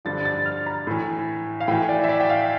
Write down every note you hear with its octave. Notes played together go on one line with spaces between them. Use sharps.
G2 D3 F3 A6
A6
F6
A#5
A2 E3
F5
A2 E3 G5
D5
E5
D5
G5
F5